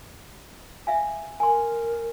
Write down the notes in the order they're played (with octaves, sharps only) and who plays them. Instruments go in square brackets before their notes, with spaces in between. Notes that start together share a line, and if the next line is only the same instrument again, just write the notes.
[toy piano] E5 F5 G#5
[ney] A#4 [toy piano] G#5 C6